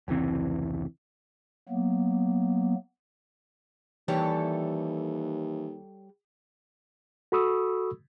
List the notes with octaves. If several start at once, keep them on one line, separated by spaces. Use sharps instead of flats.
F1 C#2 E3 C4
F#3 A#3 B3
D#2 E3 G3 A4 C#5
F#4 A4 B5 C#6 D#6 E6